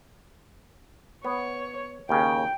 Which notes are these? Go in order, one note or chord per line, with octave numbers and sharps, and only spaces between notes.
B3 C#5
D#2 C#3 G5